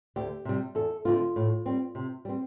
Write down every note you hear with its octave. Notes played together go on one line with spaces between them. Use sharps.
D2 G4
C3 G3
E2 A4
D3 A3 C4 F4
A2
G3 C4
C3
G3 C4